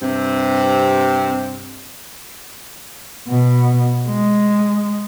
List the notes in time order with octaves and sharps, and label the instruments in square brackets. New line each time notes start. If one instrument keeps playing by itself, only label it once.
[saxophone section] G2 C3 C4
[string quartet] B2
G#3